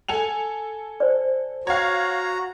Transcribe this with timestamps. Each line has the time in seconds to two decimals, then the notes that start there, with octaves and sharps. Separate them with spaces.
0.09 A4 G#5 F7
1.00 C5 D5
1.67 F#4 C#5 F5 A#5